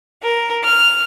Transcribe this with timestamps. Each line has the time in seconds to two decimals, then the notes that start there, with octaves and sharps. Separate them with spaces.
0.22 A#4
0.64 F6